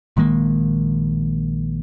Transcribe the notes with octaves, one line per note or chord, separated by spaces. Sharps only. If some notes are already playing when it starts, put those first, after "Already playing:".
A#1 D#3 G#3 A#3